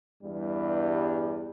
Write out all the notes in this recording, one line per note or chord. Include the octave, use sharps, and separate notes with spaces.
E2 G2 G3